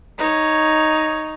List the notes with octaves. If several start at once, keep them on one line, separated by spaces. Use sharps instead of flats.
D#4 C#5